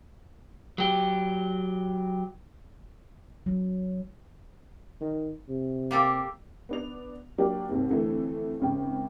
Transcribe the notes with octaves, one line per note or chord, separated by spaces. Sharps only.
F#3 G4
F#3
D#3
C3
A#3 G4 A4
B3 D4 F7
F#3 A#3 D4 G4
D#2 G#2 C3
F2 D3 E3 A3
G#1 C#3 G5